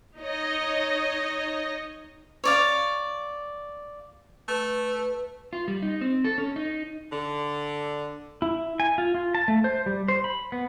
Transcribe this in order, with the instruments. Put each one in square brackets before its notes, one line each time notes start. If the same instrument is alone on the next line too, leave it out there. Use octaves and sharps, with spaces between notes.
[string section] D#4 C#5 D#5
[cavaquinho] C#5 D5 F5
[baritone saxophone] A3 [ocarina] B4
[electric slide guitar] F4
G3
D#4
C4
A4
C#4
D#4
[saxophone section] D3
[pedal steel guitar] E4
G#5
F4
F4
A5
A3
C5
G3
C5
B5
B3